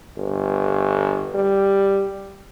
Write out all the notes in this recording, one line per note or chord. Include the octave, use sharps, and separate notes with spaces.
G1
G3